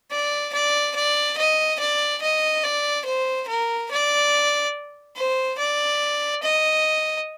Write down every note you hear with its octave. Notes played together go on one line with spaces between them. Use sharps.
D5
D5
D5
D#5
D5
D#5
D5
C5
A#4
D5
C5
D5
D#5